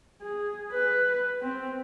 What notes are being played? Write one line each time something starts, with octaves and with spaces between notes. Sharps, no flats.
G#4
B4
C4